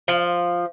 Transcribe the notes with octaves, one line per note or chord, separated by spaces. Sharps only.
F3